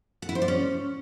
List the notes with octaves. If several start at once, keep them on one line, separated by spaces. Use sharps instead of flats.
F#5
E4
C5
D5
C#4